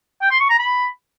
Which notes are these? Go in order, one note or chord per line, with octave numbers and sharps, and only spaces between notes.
G5
C6
C#6
A#5
B5